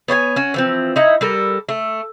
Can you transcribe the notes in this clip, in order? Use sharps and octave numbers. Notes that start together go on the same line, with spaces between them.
B3 C#5 G5 G#5
C#4 F#4
E3 F3 C4
D#4 E4 A#5
G3 A4 A#4
A3